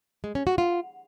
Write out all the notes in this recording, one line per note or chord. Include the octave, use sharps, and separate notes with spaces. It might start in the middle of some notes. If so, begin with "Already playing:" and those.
G#3
C#4
F#4
F4